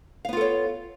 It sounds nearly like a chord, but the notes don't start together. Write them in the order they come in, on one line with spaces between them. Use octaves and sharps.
F5 B3 F4 A4 C#5